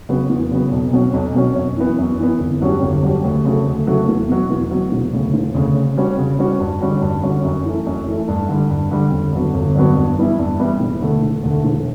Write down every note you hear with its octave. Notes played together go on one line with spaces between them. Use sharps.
C#3 F#3 B3
E2
C#3 F#3 B3
B1
B2 F#3 C#4
B1
B2 F#3 C#4
F#2
E3 B3
F#2
E3 B3
G1
G2 F#3 C#4 G4
G1
G2 F#3 C#4 G4
D2
C#3 F#3 A3
D2
C#3 F#3 A3
E2
B2 F#3
E2
B2 F#3
E1
D2 C#3
E1
D2 C#3
C#3
G3 C#4 F#4 C#5
C#3
G3 C#4 F#4 C#5
G2
D3 G3 C#4 F#4
G2
D3 G3 C#4 F#4
F#2
E3 A3
F#2
E3 A3
G2
D3 G3
G2
D3 G3
G1
G2 D3 F#3 B3
G1
G2 D3 F#3 B3
G2
E3 G3 B3 E4
G2
E3 G3 B3 E4
E1
D2 D3 A3
E1
D2 D3 A3
E1